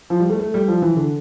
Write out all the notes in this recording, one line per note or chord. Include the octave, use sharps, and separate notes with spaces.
F3
G3
A3
A3
G3
F3
E3
D3